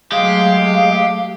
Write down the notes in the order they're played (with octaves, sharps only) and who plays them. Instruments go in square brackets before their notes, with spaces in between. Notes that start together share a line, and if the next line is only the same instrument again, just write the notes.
[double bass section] F#3 A3 [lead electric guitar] G#3 [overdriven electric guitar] G4 [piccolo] F5